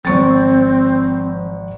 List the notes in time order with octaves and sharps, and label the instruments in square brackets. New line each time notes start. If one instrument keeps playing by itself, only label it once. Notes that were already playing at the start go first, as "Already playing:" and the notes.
[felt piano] G#1 C#6 A6 [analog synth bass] F3 [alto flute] C4